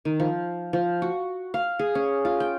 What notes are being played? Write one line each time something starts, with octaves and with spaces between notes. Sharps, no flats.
D#3
F3
F3
F#4
F5
G#4
C#4
F4
G5